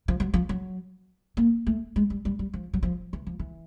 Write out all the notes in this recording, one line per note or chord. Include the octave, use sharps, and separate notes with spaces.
F3
F#3
F3
F#3
A#3
A3
G#3
G3
G3
G3
F3
F#3
F3
E3
F3
E3